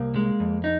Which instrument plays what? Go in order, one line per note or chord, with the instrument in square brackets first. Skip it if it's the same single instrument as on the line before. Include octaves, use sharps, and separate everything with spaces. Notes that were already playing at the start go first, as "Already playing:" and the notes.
Already playing: [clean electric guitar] C2 [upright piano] A#3
[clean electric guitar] G#3
F2
D#4